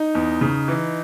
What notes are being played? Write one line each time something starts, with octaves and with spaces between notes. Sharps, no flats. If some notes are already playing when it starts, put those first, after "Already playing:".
Already playing: D#4
E2
C#3
E3